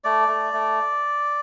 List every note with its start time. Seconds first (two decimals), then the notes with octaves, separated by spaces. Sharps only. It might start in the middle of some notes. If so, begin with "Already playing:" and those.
0.04 A3 D5
0.28 A3
0.54 A3